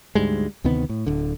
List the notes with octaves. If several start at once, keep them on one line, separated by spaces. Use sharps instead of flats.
D2 G#2 G3 G#3
D2 C3 D#3 B3
A2
D1 D3